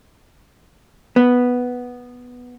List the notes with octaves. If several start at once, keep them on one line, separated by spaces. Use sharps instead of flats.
B3